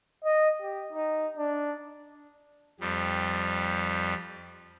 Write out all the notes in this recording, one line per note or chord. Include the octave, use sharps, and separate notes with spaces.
D#5
G4
D#4
D4
F2 G3